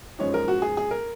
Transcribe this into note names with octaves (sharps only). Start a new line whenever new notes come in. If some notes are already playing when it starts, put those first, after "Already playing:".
F#2 F3 G#3 D#4 C#5
A#4
F#4
G#4
G#4
A#4